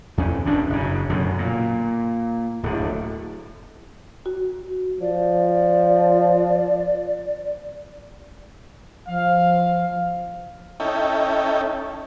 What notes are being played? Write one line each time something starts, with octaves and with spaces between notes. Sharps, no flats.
E2 C#4
E1 G2 B2 D4
F#1 C#3
F#2 B2 D3
A#2
D1 A2 D3
F#4
F3 D5
F3 F5
C#4 D#4 E4 A4 G5